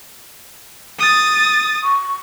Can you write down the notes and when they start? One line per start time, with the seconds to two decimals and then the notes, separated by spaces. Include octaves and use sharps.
0.99 D#6 A6
1.84 C#6